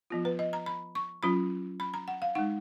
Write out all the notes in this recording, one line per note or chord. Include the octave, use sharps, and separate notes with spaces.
F3 B3 F4
B4
D#5
A#5
B5
C#6
F#3 C#4 F4 B5
B5
A#5
F#5
F5
G#3 D#4 F#5